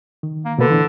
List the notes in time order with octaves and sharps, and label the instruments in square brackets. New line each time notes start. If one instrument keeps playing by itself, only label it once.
[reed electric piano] D#3
[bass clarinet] A#3
[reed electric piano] B2 A#3 B4 [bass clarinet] D3
[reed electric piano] E3 D4